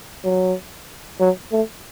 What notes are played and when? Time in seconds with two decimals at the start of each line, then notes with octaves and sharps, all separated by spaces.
0.25 F#3
1.20 F#3
1.52 A3